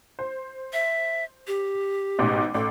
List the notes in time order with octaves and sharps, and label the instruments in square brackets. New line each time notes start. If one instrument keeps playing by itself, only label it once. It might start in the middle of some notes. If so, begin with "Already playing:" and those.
[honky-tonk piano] C5
[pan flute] E5
G4
[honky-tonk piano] A1 G#2 B2
[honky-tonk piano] A1 [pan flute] A4